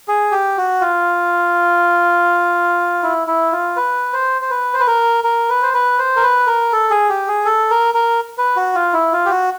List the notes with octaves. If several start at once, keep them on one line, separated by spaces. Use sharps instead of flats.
G#4
G4
F#4
F4
E4
E4
F4
B4
C5
C5
B4
C5
B4
A#4
A#4
B4
C5
B4
C5
A#4
B4
A#4
A4
G#4
G4
G#4
A4
A#4
A#4
B4
F#4
F4
E4
F4
G4
F#4